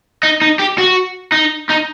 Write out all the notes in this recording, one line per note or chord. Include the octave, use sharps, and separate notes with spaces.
D#4
D#4
G4
F#4
D#4
D#4